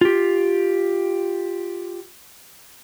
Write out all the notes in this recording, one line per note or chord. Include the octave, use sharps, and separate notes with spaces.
F4 G4